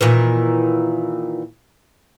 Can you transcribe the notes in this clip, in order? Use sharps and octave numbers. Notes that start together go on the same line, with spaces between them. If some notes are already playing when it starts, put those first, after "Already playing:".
A#2 D#3 E3